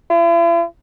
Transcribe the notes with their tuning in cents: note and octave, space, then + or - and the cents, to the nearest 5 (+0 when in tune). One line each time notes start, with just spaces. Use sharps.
E4 +45